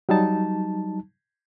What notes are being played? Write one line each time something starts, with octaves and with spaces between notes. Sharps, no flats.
F#3 G3 D#4 A5